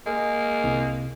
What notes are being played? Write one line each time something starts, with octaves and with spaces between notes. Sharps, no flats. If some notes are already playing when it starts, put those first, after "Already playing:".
G#3 A#3
C2